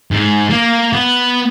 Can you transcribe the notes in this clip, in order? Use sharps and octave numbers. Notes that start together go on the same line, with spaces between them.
G#2
A#3
B3